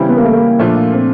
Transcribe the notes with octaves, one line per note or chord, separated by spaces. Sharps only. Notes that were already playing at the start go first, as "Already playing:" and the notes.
Already playing: C#3 E3 G3 C4 E4
B3
A#3
A3
A#3
A#2 F3 A3 D4 F4
C4